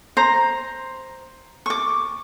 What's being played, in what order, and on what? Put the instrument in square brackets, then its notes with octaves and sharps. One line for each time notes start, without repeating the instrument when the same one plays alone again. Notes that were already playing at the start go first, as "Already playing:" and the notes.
[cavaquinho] C5 A#5
C#6 D6